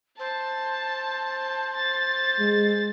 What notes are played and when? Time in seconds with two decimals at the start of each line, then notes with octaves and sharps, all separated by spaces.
0.19 C5 A5
1.76 A6
2.40 G#3